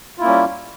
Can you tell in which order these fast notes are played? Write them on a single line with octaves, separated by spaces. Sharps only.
F4 E4 A#3 C#4 G3